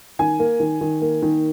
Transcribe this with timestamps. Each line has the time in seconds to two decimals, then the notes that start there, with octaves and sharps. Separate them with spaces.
0.19 D#3 G#5
0.40 A#3
0.60 D#3
0.81 D#3
1.02 A#3
1.22 D#3